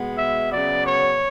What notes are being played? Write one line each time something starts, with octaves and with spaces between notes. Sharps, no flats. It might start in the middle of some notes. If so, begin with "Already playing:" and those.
Already playing: B2 G#3 B3
E5
C#3 F#3 B3 D5
C#5